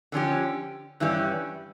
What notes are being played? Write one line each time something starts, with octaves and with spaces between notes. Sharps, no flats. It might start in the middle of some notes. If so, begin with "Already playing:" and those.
D3 F3 C#4 G4
G2 E3 G3 C#4